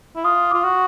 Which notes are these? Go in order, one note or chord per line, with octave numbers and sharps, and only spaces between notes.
E4
F4 D#6
F4 D6
F#4